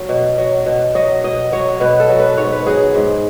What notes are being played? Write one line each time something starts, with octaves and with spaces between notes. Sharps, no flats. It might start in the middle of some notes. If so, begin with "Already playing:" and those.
Already playing: F#3
B2
F#3
B2
F#3 D#5
B2 D#5
F#3 C#5
B2 B4
A4
F#3
B4
G#2 C#5
B4
F#3 G#4
G#2